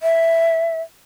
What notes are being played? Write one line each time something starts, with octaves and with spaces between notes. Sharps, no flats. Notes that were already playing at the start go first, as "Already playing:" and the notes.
E5